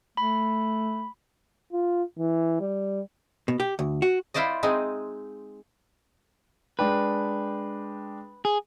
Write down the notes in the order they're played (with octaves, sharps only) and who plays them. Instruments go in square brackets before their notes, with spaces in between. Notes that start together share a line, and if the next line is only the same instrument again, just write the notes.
[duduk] A3 [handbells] B5
[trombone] F4
E3
G3
[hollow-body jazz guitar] B2
G4
D2
F#4
[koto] E4 F4 C5 D5 D#5
G#3 C4 D#4
[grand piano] G#3 D4 G5 [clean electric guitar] B4
[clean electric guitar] G#4